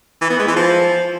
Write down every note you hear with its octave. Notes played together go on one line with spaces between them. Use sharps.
E3
B3
G#3
E3
F3